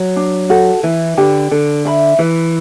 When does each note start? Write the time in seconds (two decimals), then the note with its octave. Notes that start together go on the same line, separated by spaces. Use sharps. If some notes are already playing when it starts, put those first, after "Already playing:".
Already playing: F#3
0.16 D4
0.50 F#4 A4
0.83 E3 E4
1.17 D3 G4 B4
1.51 D3 A4
1.85 E5 B5
2.19 E3 B4